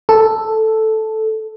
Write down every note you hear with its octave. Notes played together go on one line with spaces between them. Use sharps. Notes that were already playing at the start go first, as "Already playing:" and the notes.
A4